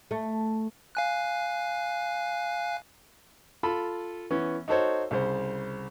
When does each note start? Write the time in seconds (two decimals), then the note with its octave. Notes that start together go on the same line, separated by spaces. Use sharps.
0.11 A3
0.95 F5 G#5 F#6
3.63 F4 A4 B5
4.30 E3 B3 C#4
4.68 D#4 F#4 A4 C5 C#5
5.11 C2 C#3 C5